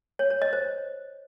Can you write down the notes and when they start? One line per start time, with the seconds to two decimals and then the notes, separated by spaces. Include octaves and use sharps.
0.19 C#5
0.30 C#5
0.42 D#5
0.53 C5